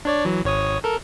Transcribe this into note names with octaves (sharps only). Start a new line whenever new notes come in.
D4 C#5 D5
E3 F#3
G#1 C#5 D#6
A4 A#4